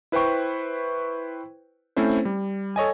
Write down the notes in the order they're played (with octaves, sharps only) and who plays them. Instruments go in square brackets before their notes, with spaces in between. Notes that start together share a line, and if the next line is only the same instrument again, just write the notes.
[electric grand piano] E4 B4 C5 G5 C#6
A3 C4 C#4 E4 C5
G3
A4 C#5 D#5 G#5